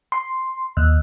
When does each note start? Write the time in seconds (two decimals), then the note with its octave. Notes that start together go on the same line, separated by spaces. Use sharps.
0.12 C6
0.77 D#2